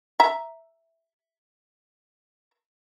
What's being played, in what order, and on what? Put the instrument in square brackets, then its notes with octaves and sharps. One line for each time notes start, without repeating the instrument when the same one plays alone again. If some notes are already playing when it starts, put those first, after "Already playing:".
[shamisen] E5 A#5